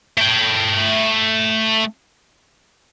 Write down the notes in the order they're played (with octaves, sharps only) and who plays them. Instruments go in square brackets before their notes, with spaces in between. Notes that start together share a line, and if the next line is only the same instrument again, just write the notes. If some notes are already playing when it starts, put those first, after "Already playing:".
[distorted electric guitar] A3 G5